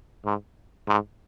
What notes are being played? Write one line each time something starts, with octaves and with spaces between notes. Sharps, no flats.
G#2
G#2